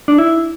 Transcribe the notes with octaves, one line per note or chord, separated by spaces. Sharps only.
D4
E4